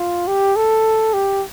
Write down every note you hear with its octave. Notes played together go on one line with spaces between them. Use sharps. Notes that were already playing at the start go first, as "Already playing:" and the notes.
Already playing: F4
G4
A4
G4